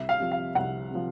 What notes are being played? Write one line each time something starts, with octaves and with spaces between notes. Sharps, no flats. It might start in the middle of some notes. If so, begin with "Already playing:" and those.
Already playing: C2 E5
F5
C3 F3
F5
C2 F#5
C3 F3